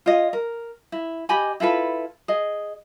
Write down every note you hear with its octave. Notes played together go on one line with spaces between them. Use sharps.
F4 C#5 D#5
A#4
E4
G4 D#5 G#5 B5
E4 F4 A4 B4
G#4 D#5